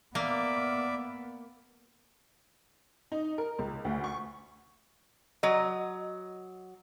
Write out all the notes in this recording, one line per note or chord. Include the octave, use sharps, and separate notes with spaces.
A#3 B3 D5 E5
D#4
A#4
C#2
D2
C#6
F#3 D#5